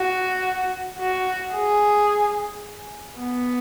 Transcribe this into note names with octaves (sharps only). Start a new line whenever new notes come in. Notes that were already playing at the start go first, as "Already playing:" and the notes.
Already playing: F#4
F#4
G#4
B3